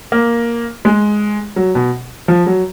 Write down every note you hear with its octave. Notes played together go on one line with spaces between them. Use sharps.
A#3
G#3
F#3
B2
F3
F#3